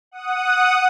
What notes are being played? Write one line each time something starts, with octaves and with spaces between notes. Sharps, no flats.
F#5 D#6